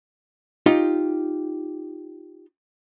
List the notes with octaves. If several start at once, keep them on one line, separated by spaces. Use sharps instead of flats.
D#4 F4 G4